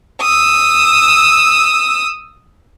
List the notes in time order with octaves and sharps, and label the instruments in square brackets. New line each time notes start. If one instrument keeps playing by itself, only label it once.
[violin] D#6 E6